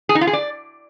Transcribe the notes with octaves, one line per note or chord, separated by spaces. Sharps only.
G#4
D#4
F4
G#4
D5